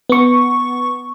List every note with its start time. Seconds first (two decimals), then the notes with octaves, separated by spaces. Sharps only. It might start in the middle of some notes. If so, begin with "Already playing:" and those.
0.09 B3 C#6